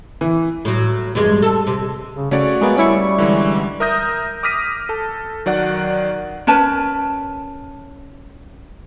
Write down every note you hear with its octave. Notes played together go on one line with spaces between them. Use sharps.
E3
A2 F#3
E2 G2 G#3
A4
C3
C#3
C#3 A3 F#4 C#5 D5
G#3 A#3 B3
G3 C#4 E4 C#6
D3 E3 G#3
A#4 E5 D#6 G6 A#6
D6 D#6 F6 A#6 B6 D#7
A4 A5
D#3 F#3 D5 F#5 F#6
C#4 A#4 B4 A5